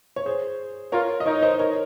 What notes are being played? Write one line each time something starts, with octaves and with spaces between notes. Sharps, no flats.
C#5
G#4 C5
F4 A#4 C#5
D#5
D#4 A#4 C#5
C5 D#5
A#4 C#5